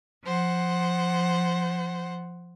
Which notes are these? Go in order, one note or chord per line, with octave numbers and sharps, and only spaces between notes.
F3 C5 F#5